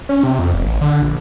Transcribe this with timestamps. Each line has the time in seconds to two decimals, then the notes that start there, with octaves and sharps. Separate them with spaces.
0.09 C#4
0.24 C3
0.39 F2
0.54 E1
0.66 A1
0.81 D3
1.02 A#1